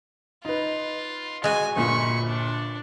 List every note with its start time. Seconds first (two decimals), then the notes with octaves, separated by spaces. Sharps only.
0.45 D#4 F4 B4
1.44 G#3 F#4 G#5
1.76 G1 A#2 F4 B5 C#6
2.28 D4